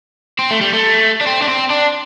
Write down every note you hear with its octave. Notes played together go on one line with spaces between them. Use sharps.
C4
A3
G3
A3
D4
C4
D4
C4
D4